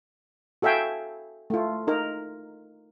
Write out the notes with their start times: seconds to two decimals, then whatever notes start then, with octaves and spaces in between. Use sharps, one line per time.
0.62 F#4 A4 E5 F5 G5 G#5
1.50 A3 F4
1.87 D#4 A#4